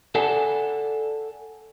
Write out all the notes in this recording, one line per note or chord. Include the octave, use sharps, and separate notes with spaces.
A4 D5 F#5 G#5 A5